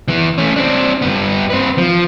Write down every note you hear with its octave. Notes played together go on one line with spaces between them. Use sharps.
E3 B3
A3 C#4
C4 D4
G2 B3
C4 B4
F3